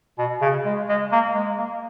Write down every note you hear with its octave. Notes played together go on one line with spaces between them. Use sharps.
B2
C#3
G#3
G#3
A#3
G#3
A#3